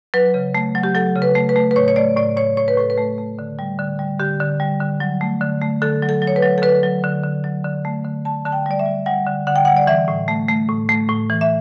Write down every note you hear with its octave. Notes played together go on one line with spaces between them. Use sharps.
F#3 B4
C#3
A3
F#3
G4
F#3 A4
C#3
B4
A3
B4
A3
B4
A2 C#5
C#5
A3 D5
A2 D5
A2 C#5
A2 C#5
B4
A2 A4
B4
A3
A3
D3
G3
D3
G3
D3 G4
D3
G3
D3
F#3
A3
D3
A3
D3 A4
F#3
A4
F#3
C#5
B4
F#3
A4
D3 B4
F#3
D3
D3
F#3
D3
A3
D3
D3 A5
D3 A5
G5
G3 D5
E5
G3
G3 F#5
D3
D3 F#5
G5
G3 F#5
D5
E3 E5
A2
A3
A3
A2
A3
A2
E3
E5